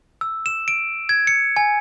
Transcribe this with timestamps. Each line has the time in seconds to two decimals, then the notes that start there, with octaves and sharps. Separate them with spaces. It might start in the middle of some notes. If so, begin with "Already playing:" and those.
0.21 E6
0.46 E7
0.68 D7
1.09 G#6
1.27 C#7
1.56 G#5